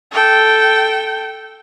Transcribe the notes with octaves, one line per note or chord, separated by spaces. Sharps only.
A4 G5